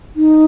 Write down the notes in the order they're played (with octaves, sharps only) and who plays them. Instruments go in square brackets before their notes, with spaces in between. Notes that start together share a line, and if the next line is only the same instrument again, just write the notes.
[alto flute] D#4